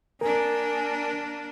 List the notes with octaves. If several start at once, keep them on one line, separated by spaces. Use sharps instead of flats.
A#3 D4 A#4 G#5